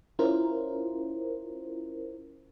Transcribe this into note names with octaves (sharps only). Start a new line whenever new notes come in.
C#4 E4 F4 A#4 C5